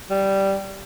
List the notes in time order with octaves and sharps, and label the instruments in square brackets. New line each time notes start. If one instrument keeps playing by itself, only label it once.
[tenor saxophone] G3